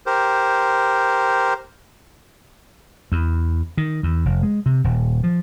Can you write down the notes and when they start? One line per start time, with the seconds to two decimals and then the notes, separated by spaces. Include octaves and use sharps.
0.06 G4 A#4 C5
3.12 E2
3.78 D#3
4.03 E2
4.25 F1
4.43 G#3
4.66 C3
4.84 D#1
5.24 F3